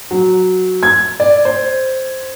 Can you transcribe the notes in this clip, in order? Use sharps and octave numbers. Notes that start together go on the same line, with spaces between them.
F#3
G#6
D5
C5